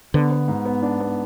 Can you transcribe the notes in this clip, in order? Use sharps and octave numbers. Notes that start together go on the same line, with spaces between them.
D3 B3
B3
G#2
B3
D4
B3